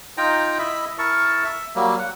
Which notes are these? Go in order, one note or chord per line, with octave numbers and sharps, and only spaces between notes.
D#4 F4 G5 A#5
E4 D#5 E5 B5
E4 A#4 A5 C#6
E5
F#3 G3 A#3
F#5